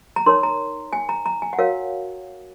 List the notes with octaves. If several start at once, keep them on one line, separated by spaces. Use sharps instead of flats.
A#5
D#4 A#4 C#5 C6
A#5
G#5
A#5
A#5
G#5
F#5
F#4 A#4 C#5 F5